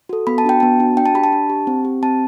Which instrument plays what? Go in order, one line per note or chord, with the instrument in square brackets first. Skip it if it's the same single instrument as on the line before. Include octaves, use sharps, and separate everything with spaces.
[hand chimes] F#4 A4
B3 B5
A5
D4 F#4 G5
B3 A5
D4 F#4
D4 G5
A5
G4 B5
A5
D4
G4
C4
G4
C4 A5